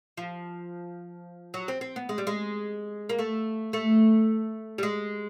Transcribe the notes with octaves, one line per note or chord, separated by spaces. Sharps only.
F3
F#3
C4
C4
B3
G#3
G3
G#3
A#3
A3
A3
G3
G#3